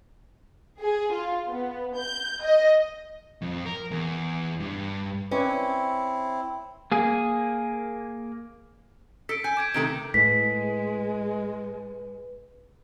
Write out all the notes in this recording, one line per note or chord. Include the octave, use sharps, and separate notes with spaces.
G#4
F4
B3
G6
D#5
F2
A#4
E2
G2
C4 C#4 E4 B4 D5
A#3 G#4
A4 B6 D7
G#5 G6
D6 G#6 D7
C3 D#3 A3 D7
A2 G#3 B4 B6